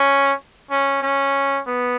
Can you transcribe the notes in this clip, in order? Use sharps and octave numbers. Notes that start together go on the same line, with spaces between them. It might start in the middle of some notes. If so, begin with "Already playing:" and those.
Already playing: C#4
C#4
C#4
B3